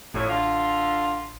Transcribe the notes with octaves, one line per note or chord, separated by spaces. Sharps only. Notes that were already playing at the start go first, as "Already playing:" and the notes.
A1 F2 A2 C#5
D3 F4